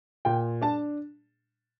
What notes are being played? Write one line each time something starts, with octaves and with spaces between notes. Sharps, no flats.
A#2 G5
D4 A5